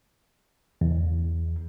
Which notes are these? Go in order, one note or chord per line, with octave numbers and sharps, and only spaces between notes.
E2